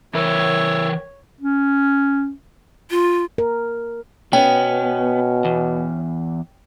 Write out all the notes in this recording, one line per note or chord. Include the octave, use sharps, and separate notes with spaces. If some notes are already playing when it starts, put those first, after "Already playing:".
E3 E4 A#4 B4 C#5
C#4
F4
A#4
B2 B3 C#4 G5
E2